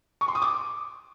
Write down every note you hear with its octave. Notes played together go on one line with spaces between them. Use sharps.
C#6
C6
D#6
D6